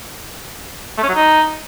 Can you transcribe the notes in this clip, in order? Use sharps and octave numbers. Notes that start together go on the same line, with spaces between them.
A3
C#4
F#3
D#4